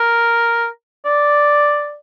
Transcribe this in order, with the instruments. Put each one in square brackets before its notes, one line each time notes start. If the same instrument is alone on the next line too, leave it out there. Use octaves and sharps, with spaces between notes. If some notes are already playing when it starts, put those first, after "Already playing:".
Already playing: [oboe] A#4
D5